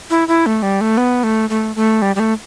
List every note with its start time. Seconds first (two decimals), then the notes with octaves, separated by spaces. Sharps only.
0.10 E4
0.28 E4
0.46 A3
0.63 G3
0.81 A3
0.97 B3
1.24 A3
1.50 A3
1.76 A3
2.02 G3
2.16 G3
2.20 A3